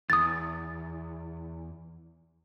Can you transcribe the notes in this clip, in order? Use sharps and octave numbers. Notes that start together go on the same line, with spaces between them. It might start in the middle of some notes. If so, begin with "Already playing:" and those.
E2 D#6 A6